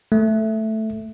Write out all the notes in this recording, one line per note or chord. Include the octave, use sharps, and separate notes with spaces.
A3